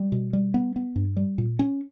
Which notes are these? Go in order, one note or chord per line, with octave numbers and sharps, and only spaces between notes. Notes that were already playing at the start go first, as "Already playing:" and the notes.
Already playing: G3
B2
G3
B3
B3
G2
G3
A#2
C#4